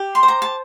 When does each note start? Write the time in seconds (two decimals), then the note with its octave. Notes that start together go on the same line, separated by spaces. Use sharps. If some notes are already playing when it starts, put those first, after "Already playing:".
Already playing: G4
0.15 C6
0.23 C5
0.28 A#5
0.42 A5